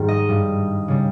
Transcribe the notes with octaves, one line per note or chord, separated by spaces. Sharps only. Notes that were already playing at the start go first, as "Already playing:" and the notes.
Already playing: G#2 D#3 G3
D#5
G2 G3
C#3 G3